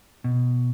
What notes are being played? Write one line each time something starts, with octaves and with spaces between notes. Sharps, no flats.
B2